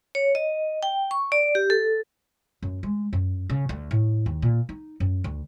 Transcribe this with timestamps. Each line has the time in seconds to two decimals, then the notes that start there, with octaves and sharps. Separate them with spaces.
0.15 C#5
0.35 D#5
0.83 G5
1.11 C#6
1.32 D5
1.55 G4
1.70 A4
2.62 F#2
2.83 G#3
3.13 F#2
3.49 C#3
3.69 D2
3.91 A2
4.26 D#2
4.42 A#2
4.69 D#4
5.00 F#2
5.24 D2